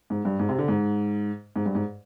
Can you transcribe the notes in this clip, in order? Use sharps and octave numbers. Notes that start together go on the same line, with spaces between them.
G#2
G2
G#2
C3
D3
G#2
G#2
G2
G#2